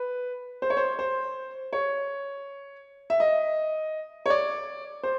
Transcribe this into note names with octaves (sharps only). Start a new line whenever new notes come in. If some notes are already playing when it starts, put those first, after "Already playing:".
Already playing: B4
C5
C#5
C5
C5
C#5
E5
D#5
C#5
D5
C5